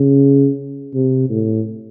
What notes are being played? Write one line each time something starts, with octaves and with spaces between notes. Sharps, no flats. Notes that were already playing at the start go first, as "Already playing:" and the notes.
Already playing: C#3
C3
A2